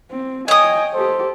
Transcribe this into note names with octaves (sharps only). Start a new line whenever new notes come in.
C4
C#5 D#5 G5 G#5 D#6
G4 A4 C5